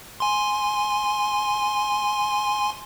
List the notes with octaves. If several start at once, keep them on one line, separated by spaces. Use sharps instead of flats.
G#5 C6